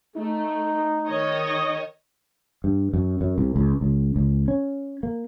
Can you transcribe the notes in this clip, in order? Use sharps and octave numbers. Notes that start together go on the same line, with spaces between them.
A3 D#4
D#3 C#5 D#5
G2
F#2
F#2
C2
C#2
C#2
C#2
C#4
A#3